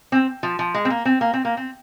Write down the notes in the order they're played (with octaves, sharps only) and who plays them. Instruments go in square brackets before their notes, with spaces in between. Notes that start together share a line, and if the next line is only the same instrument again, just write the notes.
[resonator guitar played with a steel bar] C4
F3
F3
G#3
C4
A#3
C4
A#3
C4
A#3
C4